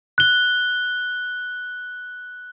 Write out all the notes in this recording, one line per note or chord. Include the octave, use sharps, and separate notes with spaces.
F#6 G7